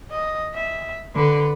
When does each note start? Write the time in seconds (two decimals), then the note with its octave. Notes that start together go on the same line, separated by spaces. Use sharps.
0.11 D#5
0.55 E5
1.15 D3 B4